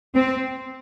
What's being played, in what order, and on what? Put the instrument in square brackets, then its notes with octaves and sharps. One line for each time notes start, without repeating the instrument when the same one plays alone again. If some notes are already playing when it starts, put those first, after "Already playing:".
[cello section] C4